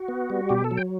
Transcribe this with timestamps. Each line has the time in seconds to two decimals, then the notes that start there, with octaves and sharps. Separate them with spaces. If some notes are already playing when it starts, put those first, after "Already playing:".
Already playing: F#4
0.08 B3
0.30 G3
0.49 B2 G4
0.64 A4
0.71 F#3
0.77 G5